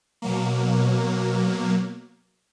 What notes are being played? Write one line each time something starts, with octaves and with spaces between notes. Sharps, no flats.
B2 F#3 A#3